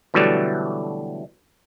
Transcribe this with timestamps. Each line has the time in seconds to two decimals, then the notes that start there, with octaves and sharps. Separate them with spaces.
0.14 B2 D3 E3 F#3 G3 A3